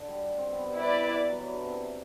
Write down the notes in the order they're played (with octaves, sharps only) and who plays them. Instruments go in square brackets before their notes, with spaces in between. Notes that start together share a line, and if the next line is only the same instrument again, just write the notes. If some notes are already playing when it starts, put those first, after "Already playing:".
Already playing: [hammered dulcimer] D3
G3
C4
B3
G3
[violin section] E4 B4 D5
[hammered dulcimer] F#3
E3
D3
C3
C3